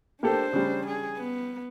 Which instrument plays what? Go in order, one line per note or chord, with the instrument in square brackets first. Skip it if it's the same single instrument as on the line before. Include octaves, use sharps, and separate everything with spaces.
[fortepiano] A#3 G4 A4 [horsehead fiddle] D4 C5
[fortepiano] C#3 G3
[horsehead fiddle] G#4
B3